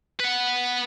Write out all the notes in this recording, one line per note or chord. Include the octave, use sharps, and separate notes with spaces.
B4 F#5